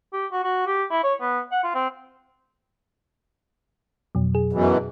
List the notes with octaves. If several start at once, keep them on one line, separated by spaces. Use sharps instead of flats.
G4
F#4
F#4
G4
E4
C#5
B3
F#5
F4
C4
F2 B2 F#3
G#4
F#2 B2 E3